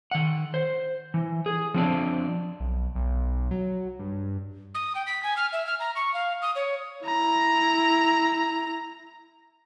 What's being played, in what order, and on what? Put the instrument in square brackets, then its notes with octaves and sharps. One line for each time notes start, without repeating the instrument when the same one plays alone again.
[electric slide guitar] D#3 F#5
C5
E3
G#4
F3 C4 D4
[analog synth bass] B1
B1
F#3
G2
[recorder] D#6
G5
B6
G#5
F6
E5
F6
A#5
C#6
F5
D#6
C#5
[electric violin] E4 A#5